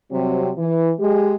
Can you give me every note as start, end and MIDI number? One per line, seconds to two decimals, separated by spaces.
0.11 0.50 48
0.11 0.50 54
0.11 0.50 55
0.11 0.50 60
0.58 0.92 52
1.00 1.36 56
1.00 1.36 67